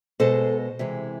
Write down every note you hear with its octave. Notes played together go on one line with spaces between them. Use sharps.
B2 G#3 A4 C5
C3 E3 G#3